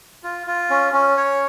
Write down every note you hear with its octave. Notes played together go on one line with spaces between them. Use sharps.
F4
F4
C#4
C#4
C#5